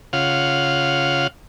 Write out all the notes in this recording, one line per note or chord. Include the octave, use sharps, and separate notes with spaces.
C#3 F4 F5 F#5